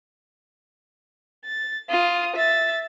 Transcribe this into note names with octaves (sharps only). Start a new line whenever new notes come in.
A6
F4 D#6
E5 A6